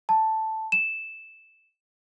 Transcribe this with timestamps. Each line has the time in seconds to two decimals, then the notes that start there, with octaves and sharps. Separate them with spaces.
0.09 A5
0.72 E7